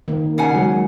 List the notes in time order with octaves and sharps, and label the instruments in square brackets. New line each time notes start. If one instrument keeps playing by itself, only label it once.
[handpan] D#3 A#3
[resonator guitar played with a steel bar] C#3 F#5 G#5
[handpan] F#3 G#3